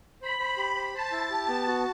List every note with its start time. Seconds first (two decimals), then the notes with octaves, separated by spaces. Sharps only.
0.22 C5 B5
0.39 C5
0.57 G4
0.76 C5
0.93 C5 A5
1.12 E4
1.30 G4
1.48 B3
1.67 F#4